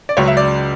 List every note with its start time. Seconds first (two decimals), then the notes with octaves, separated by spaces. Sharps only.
0.09 D5
0.17 C#2 C#3 F#3 C#5
0.28 E5
0.37 D5